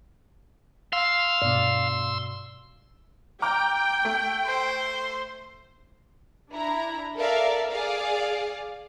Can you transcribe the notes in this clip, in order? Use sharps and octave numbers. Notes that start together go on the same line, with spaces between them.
F5 C6 E6
G2 B2 D5
G5 A#5 D6 F6
A3
C5
D4 E4 A#5
A4 A#4 D5 E5 F5
G#4 D5 F5